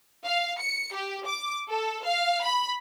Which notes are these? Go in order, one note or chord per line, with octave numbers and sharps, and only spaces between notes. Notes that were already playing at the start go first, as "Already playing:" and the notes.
F5
C#7
G4
D6
A4
F5
B5